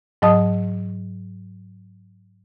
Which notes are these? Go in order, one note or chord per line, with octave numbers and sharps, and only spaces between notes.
G#2 F#3 D#5 A5 D#6